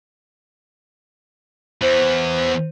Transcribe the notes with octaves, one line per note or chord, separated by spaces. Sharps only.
E2 E3 C5